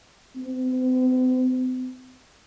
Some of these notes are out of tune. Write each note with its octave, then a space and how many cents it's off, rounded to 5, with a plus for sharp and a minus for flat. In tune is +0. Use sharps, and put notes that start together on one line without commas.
C4 -45